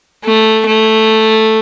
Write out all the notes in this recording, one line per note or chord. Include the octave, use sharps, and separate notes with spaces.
A3
A3